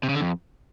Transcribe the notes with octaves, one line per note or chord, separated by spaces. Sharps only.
C3
C#3
D3
F2